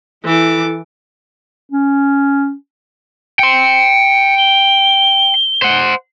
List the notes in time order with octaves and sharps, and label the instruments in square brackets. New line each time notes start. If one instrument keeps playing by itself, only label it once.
[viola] E3 D6 [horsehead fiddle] E4 A4
[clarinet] C#4
[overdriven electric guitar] G5 C6 [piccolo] C#7
[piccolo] G7
[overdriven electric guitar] C5 F#5